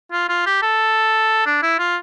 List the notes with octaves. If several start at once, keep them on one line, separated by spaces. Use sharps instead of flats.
F4
F4
G4
A4
D4
E4
F4